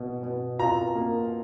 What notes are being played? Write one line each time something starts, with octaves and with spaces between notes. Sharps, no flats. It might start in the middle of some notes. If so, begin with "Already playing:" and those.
Already playing: B2
B2
F4 A#5
A#3